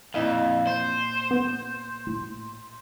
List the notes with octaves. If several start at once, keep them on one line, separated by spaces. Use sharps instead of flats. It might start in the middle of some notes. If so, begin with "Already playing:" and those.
F2 A#2 E4 D#5 F5
C5
B3
A2